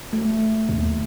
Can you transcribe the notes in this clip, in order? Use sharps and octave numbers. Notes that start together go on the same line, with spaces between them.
A3
D#2